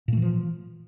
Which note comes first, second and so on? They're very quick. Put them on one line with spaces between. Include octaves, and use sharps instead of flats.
A#2 A3 E3 F3